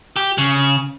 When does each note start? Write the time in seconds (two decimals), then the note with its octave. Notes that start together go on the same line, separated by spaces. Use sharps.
0.16 G4
0.38 C#3